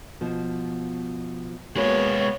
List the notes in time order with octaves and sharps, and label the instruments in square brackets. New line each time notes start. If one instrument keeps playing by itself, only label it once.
[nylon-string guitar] B2 F3
[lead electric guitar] G#3 B4 [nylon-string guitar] A#3 F#4 G#4 [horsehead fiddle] B3 C#5